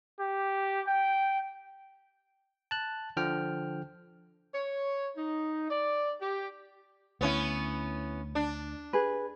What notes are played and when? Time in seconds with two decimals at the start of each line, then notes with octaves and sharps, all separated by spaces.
0.20 G4
0.87 G5
2.71 A5 F#6
3.17 D3 F3 G5 F6
4.54 C#5
5.17 D#4
5.70 D5
6.20 G4
7.21 D2 B3 C#4 E4
8.35 D4
8.93 G#4 B4